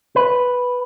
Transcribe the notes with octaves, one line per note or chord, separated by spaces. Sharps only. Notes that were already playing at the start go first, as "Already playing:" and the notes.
B4